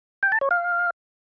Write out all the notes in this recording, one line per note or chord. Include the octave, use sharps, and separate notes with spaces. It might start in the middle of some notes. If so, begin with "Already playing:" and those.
G5
A5
C#5
F5